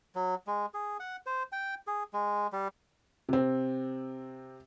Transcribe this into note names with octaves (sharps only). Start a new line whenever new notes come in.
F#3
G#3
G#4
F#5
C5
G5
G#4
G#3
G3
C3 C4